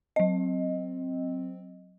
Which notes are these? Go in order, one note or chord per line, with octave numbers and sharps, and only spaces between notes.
F#3 C4 D#5